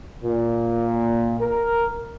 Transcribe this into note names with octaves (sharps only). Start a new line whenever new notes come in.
A#2
A#4